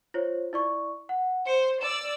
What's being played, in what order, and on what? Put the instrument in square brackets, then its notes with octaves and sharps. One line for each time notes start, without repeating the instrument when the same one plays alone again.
[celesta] F4 C5 C#5
E4 D5 C#6
F#5
[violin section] C5 [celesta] C#7
[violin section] D5 E6 [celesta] E7